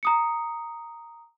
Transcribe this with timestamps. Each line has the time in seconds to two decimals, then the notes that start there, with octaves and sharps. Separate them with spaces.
0.03 A#5 D#6 C#7